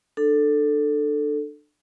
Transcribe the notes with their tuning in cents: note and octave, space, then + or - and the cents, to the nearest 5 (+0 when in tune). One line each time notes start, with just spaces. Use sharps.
D4 +30 A4 +5